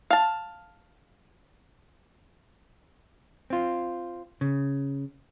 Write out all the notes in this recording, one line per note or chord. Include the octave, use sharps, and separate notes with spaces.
F5 A5
C4 F4
C#3